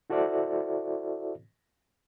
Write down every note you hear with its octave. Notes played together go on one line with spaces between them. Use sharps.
E4 F#4 A4 C5 D5 E5